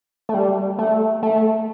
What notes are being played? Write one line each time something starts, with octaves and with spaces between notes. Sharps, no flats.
A3
G3
A3
A3